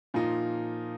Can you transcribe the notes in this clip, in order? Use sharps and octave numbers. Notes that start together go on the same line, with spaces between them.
A#2 F3 A#3 D#4